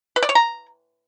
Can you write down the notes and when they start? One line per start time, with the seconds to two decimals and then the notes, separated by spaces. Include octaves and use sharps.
0.16 B4
0.23 D5
0.29 C#5
0.35 A#5